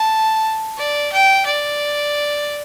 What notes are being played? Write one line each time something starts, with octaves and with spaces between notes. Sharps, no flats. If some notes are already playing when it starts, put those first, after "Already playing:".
Already playing: A5
D5
G5
D5